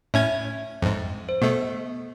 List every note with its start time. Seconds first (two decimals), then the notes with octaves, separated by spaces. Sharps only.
0.14 A2 C#4 E5 G#6
0.82 F2 G#2
1.29 C5
1.42 B2 A3 B3